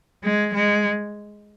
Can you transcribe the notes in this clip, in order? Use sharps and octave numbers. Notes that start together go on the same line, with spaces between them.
G#3
G#3